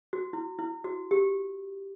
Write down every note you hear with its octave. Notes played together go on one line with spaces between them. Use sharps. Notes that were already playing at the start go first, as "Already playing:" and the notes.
F#4
E4
E4
F#4
G4